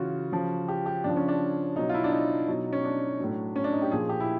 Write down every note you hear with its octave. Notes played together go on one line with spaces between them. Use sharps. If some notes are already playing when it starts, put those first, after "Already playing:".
Already playing: C#3 E3 F4 F#4
C#3 F3
G4
G4
C#3 F3 D4
C#4
D4
B2 F#3 D#4
F4
E4
D4
D#4
B2 F#3
C#4
D4
A2 F#3
C#4
D4
D#4
G4
A#2 F3 G#4
G4
E4